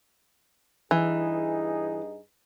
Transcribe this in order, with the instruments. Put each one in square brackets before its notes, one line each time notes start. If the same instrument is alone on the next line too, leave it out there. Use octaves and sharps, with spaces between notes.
[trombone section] G2 D#4 G#4 [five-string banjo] E3